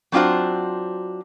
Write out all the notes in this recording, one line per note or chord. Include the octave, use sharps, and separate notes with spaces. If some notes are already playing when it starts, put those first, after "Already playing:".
F#3 C4 D4 F4 F#4 C5